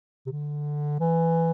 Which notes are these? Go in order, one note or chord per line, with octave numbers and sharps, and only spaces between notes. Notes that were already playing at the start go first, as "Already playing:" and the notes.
C3
D3
E3